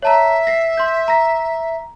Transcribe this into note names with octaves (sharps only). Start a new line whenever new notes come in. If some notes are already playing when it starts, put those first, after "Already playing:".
C#5 E5 A5 A#5
A#6 C7
C6 G6
A#5 A#6